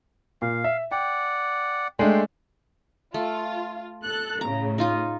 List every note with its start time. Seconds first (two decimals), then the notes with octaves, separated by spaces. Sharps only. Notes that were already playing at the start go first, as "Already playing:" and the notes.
0.42 A#2 F5
0.64 E5
0.91 D5 F#5 G5
1.99 G#3 A3 D4 G5 C6
3.14 A3 F4
4.03 A4 F#6
4.41 A2 C#3 A#5
4.78 D#4 F4 D#5